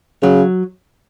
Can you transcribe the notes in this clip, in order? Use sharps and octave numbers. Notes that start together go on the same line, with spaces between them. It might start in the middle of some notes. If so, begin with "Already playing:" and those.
C#3 F#3